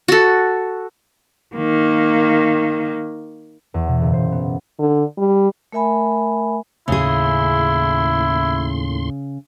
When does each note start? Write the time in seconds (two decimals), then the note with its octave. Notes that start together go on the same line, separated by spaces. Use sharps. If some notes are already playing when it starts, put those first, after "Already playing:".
0.08 F#4 A4
1.55 D#3 A#3
3.74 E2
3.88 B2
4.02 F#1
4.13 C5
4.32 B3
4.79 D3
5.18 G3
5.72 A3 A#4 E5 G#5 B5
6.88 D#2 A2 C#3 E4 G#4 C6